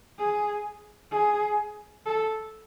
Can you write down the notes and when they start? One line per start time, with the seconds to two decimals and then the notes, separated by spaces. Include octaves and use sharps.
0.18 G#4
1.11 G#4
2.06 A4